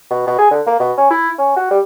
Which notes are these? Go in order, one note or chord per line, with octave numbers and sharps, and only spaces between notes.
B2
B2
G#4
D3
A#3
B2
C#4
E4
C#4
F#4
G3